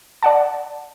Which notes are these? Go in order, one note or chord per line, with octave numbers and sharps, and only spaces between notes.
D5 F#5 A5